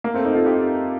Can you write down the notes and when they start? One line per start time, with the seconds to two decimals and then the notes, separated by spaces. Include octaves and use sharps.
0.04 A#3
0.14 A3 C4
0.25 C4 D#4
0.35 F4 A4
0.46 D#4 G4